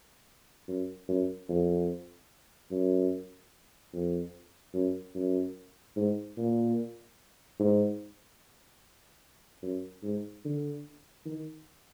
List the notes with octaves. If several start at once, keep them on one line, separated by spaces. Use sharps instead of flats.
F#2
F#2
F2
F#2
F2
F#2
F#2
G#2
A#2
G#2
F#2
G#2
D3
D#3